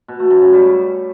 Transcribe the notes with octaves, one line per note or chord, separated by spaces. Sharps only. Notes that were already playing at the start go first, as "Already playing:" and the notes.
B2
A3
F#2
C#3
G3